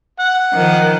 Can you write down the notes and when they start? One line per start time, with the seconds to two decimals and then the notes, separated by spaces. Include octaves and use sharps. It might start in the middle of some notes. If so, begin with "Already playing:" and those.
0.20 F#5
0.53 D#3 F3